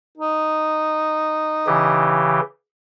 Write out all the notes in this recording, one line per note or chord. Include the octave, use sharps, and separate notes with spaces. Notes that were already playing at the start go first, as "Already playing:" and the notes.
D#4
C#3 E3 G4